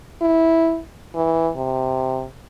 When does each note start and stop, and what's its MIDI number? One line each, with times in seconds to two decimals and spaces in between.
0.22 0.80 64
1.15 1.51 52
1.56 2.26 48